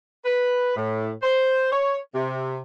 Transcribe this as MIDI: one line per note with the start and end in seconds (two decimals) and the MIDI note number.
0.25 0.72 71
0.76 1.09 45
1.23 1.69 72
1.71 1.98 73
2.15 2.59 48